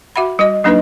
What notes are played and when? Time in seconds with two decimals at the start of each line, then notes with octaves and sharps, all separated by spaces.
0.16 F#4 E5 F#5 B5
0.39 G3 F#4 D#5
0.64 F#3 A#3 D4 D#4 B4 D#5